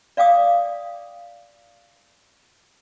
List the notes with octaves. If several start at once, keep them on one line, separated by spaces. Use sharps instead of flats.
D5 F5 G5 D6 D#6